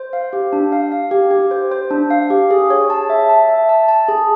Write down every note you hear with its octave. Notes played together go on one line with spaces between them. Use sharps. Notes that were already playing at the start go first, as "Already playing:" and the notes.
Already playing: C5
F5
G4
D4
F5
F5
G4
G4
C5
C5
D4
F5
G4
G#4
C#5
A5
E5
A5
E5
A5
A5
G#4